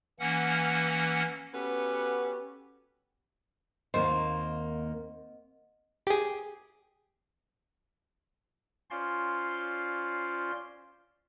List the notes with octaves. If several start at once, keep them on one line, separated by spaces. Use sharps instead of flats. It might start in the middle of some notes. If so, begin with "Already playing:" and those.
E3 A#3 C#4 F#5 F6
B3 C#4 F#4 G4 A4 B4
D#2 A#3 C4 D#4 C5 D#5
G4 G#4
C#4 F4 C5 D5 F5 C6